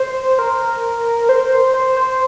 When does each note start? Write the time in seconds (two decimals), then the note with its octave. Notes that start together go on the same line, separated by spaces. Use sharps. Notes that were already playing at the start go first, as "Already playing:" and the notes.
Already playing: C5
0.39 A#4
1.29 C5
1.74 C5
1.97 C5